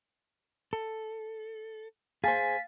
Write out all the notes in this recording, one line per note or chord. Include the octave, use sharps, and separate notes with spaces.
A4
G#4 C5 F5 G#5 A6 B6